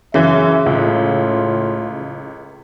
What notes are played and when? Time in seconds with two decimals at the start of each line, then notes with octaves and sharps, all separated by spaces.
0.14 F#2 C#3 E3 E5
0.66 C#2 A2 F4